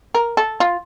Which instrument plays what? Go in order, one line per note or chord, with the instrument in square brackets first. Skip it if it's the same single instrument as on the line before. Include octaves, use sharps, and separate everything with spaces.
[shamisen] A#4
A4
F4